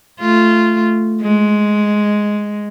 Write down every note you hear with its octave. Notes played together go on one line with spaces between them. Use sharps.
A3 F4
G#3